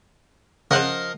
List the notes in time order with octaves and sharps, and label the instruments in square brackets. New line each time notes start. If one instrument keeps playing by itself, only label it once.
[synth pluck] C#3 F#6 [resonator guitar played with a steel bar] F3 C5 F#5 [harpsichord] A#4 D#5 F5